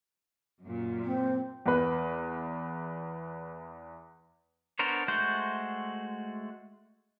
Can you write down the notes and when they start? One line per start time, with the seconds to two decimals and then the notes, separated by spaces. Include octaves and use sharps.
0.63 F#2 A#2
1.05 C4
1.66 E2 B4
4.79 B3 D4 A#4 C5 C#5
5.08 G#3 A3 F#4 C5 G6